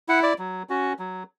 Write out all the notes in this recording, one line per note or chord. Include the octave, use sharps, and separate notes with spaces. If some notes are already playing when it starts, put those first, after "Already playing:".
E4 F#5
D5
F#3
C#4 F#4
F#3